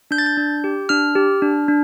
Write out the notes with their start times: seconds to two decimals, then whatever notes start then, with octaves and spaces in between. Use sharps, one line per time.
0.11 D4 G6
0.18 A6
0.26 G6
0.37 D4
0.64 G4
0.89 D4 F6
1.15 G4
1.42 D4
1.68 D4